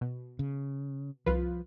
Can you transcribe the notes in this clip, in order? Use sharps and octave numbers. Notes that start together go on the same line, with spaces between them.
B2
C#3
C2 F3 F4 B4